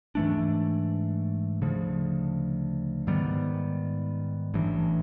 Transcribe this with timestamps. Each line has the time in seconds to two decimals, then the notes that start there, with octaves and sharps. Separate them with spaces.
0.15 G#2 E3 A3 D4
1.62 D2 C#3 F3
3.07 G#2 D#3 G3 B3
4.54 A1 G2 E3